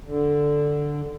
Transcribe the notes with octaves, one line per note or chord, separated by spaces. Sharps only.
D3